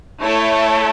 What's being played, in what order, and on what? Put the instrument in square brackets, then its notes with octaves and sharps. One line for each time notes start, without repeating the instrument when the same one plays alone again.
[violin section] A3 E4 A4 C#5